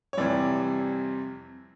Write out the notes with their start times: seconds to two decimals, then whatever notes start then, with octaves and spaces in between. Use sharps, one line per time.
0.13 C#5
0.17 F2 C3 E3 G3 D5